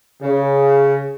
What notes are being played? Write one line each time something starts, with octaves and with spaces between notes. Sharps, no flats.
C#3